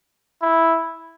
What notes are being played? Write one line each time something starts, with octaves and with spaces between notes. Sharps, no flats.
E4